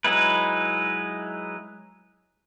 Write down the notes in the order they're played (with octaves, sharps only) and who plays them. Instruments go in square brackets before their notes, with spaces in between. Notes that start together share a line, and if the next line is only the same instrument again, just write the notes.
[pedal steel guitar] F#3 G#3 D#4 E4 B4